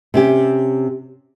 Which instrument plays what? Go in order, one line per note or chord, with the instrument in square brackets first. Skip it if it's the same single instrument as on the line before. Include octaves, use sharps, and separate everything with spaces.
[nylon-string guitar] C3 C#4 G4